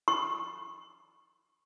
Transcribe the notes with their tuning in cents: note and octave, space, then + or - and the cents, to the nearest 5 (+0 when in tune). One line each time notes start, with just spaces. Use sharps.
C#6 -25